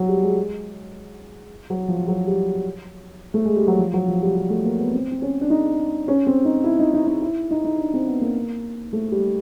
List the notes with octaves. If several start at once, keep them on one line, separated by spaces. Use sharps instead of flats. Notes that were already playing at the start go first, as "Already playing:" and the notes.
Already playing: F#3
G3
G#3
F#3
F3
F#3
G3
A3
G#3
G3
F#3
F3
F#3
F3
G3
G3
A3
A#3
B3
C4
C4
C#4
D4
D#4
C#4
C4
D#4
E4
D#4
D#4
D#4
E4
D#4
D#4
D4
C4
B3
A#3
A3
G3